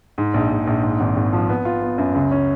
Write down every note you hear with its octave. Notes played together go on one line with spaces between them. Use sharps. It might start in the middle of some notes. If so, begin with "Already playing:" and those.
G#2
A#1
A#1
A#1
G#2
G#1
G#1
F3
B3
F4
B3
F#2
C#2
C#4